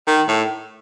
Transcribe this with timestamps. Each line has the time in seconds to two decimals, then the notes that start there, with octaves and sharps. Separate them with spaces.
0.07 D#3
0.28 A2